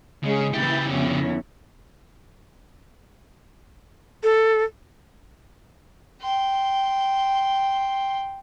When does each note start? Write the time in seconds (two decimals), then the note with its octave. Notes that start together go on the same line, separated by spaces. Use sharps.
0.24 C#3 G#3 C#4 G#4
0.54 C#3 E3 A#3 E4 G4 G6 A6
0.90 F2 A#2 D3 B3 C#4 E4
4.23 A4
6.21 G5 C6